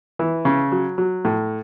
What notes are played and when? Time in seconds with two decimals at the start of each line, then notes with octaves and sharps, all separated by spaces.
0.19 E3
0.45 C#3
0.72 F#3
0.98 F#3
1.25 A2